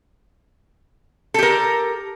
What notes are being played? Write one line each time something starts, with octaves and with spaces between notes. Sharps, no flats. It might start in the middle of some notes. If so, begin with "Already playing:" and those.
G4 A4 A#4